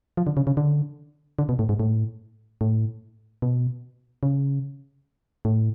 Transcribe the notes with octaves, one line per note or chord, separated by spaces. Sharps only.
F3
D3
C#3
C#3
D3
D3
B2
A2
G#2
A2
A2
B2
C#3
A2